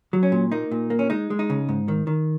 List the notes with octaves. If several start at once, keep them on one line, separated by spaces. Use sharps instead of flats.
F#3
C#4
A#2
A#3 D#4
A#2
A#3
C#4
G#3 D#4
G#3
D#4
C#3
G#2
D#3
D#3